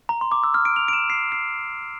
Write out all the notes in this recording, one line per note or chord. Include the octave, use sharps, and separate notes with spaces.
A#5
C6
D6
E6
F6
D7
F7
D7
E7
C7
C7